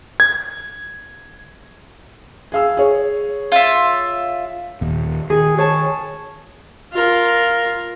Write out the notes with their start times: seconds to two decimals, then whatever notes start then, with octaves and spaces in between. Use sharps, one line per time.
0.20 G#6
2.52 G#4 F5 E6
2.77 G#4 C#5
3.52 F4 E5
4.81 D#2 A#2
5.30 D#3 G#4
5.58 G#4 C#5 A5
6.92 F4 A#4